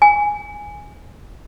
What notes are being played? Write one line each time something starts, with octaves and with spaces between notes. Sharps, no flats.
G#5